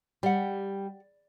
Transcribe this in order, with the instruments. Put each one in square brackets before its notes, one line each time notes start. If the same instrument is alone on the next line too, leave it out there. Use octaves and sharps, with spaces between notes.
[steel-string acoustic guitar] G3 [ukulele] G4 F#5